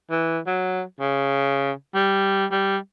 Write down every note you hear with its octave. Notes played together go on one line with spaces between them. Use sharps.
E3
F#3
C#3
G3
G3